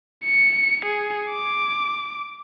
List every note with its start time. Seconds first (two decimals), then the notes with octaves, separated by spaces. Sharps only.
0.25 C#7
0.86 G#4
1.30 D6